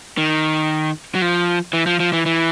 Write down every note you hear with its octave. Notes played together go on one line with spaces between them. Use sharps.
D#3
F#3
F3
E3
F3
F3
E3
E3